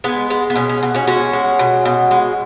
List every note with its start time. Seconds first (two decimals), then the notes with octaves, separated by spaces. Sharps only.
0.04 G#3 B3
0.30 G#3
0.50 B3
0.55 B2 C#4
0.69 C#4
0.83 B2
0.95 C#4 F#4
1.07 G#3 C#4 F#4
1.33 G#3
1.59 B2
1.85 B2
2.11 G#3